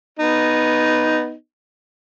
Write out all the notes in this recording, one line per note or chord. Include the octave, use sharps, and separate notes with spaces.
B3 D#4